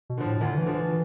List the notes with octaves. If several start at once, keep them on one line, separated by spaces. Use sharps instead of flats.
B2
D3 F3
A2
D2 D3
E3
D3 F3
E3